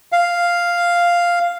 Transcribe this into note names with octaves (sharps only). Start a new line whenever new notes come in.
F5